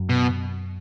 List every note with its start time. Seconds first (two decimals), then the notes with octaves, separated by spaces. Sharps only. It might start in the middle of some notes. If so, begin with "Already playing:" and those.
Already playing: F#2
0.09 B2